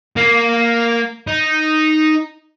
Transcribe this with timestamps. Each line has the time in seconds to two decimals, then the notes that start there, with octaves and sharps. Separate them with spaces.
0.17 A#3
1.28 D#4